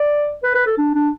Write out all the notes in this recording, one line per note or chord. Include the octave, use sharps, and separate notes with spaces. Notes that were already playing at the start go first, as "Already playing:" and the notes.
Already playing: D5
B4
B4
A4
D4
D4